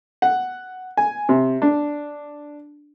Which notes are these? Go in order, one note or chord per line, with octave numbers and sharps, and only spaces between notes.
F#5
G#5
C3
D4